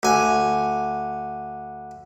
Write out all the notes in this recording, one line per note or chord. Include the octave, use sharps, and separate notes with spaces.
D2 G#5